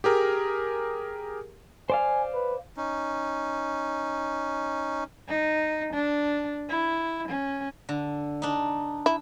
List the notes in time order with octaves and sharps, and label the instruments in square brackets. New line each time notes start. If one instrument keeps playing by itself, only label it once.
[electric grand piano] G4 G#4 A#4
[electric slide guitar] C5 D5 F5 [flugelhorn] G#5
[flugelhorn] B4
[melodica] C#4 D#4
[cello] D#4
D4
E4
C#4
[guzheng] D3
D4 D#4
[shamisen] E4